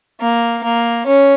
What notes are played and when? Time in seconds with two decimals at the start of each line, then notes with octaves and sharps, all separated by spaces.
0.21 A#3
0.63 A#3
1.07 C#4